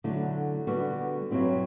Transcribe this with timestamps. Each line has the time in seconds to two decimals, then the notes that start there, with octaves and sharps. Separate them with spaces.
0.04 D3 F#3 A3 E4
0.67 D3 G3 B3 F#4
1.30 G2 F#3 C4 E4 G4